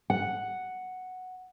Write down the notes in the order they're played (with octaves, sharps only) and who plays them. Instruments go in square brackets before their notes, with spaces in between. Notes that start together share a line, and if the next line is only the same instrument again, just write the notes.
[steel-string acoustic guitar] F#5